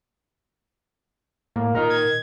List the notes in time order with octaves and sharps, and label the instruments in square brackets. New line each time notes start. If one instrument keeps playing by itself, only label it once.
[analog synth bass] A2 [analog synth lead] A#3
[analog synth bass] A#2 [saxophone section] D#3 [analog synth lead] A#4
[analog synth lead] G#6